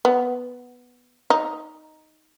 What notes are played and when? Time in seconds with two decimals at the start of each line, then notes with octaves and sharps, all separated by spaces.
0.05 B3
1.30 D#4